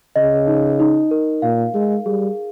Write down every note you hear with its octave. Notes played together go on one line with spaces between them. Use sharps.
C#3 D#5
D#4
D#4
A#4
A#2 F5
G#3 G#4
G3 G#4